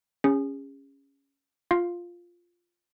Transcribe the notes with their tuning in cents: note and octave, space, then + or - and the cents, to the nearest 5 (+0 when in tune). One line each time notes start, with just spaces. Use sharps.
C#4 +0 G#4 -35
F4 +0 F5 +0